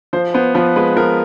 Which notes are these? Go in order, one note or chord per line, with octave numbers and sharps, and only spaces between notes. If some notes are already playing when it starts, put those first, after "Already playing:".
F3 C5
B3 C5
F3 B4
G#3 B4
F3 A#4